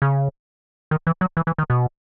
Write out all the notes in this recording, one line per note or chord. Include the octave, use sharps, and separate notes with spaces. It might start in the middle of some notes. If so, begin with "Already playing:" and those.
C#3
D#3
E3
F#3
E3
E3
D#3
B2